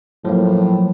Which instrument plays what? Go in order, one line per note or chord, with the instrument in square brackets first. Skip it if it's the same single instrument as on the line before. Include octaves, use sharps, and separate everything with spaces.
[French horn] A2 [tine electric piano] F3 F#3 A#3